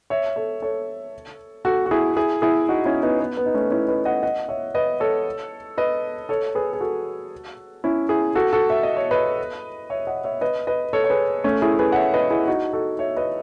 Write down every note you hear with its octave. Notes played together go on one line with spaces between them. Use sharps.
C#5 E5
A4 C#5
A4 C#5
F#4 A4
F#4
E4 G#4
E4 G#4
E4 G#4
D#4 F#4
C#4 E4
B3 D#4
B3
B3
D#4
A3 C#4
C#4 E4
B4 D#5
D#5 F#5
D#5 F#5
C#5 E5
B4 D#5
A4 C#5
B4 D#5
A4 C#5
G#4 B4
G#4
F#4 A4
C#4 E4
E4 G#4
F#4 A4
F#4 A4
E5
D#5
C#5
B4 D#5
C#5 E5
D#5 F#5
C#5 E5
B4 D#5
B4 D#5
A4 C#5
C#5
G#4 B4
A3 C#4
E4 G#4
G#4 B4
F#5
C#5 E5
B4 D#5
E4 G#4
D#4 F#4
F#4 A4
C#5 E5
B4 D#5